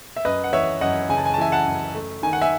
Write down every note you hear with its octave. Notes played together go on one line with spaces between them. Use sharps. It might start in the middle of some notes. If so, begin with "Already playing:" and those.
E5
F#2 B4 D#5
F#5
E3 C#5 E5
F#2 D#5 F#5
C#3 G#5
A5
G#5
A5
E3 E5 G#5
F#5 A5
F#2
A3
D#3 G#5
F#5
E5 G#5